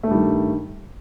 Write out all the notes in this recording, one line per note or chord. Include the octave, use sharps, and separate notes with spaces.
G2 D#3 G3 A3